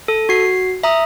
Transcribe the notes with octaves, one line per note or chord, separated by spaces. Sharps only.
A4
F#4 C7
E5 A#5 D#6